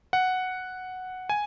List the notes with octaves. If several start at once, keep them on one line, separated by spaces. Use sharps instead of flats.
F#5
G#5